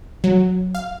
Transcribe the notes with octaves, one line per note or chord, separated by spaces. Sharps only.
F#3
F5